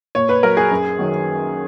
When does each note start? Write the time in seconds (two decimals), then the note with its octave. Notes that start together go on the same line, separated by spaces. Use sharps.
0.15 A#2 C#5
0.29 B4
0.43 F#3 A#4
0.57 G#4
0.71 F#2
0.99 D#3 F#3